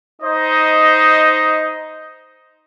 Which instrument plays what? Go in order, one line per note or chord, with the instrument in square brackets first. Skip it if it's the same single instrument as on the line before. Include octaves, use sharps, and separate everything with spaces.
[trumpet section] D#4 C5 D#5